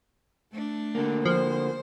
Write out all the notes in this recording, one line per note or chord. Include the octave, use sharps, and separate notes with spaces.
A3 D4
D3 A#3
F3 C5